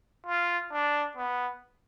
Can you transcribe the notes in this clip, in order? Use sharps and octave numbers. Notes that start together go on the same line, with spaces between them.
F4
D4
B3